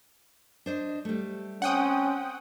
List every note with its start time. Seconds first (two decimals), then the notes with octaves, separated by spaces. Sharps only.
0.66 D4 C5 D#5
1.05 G3 A3
1.62 C4 C#4 F#5 G5 D#6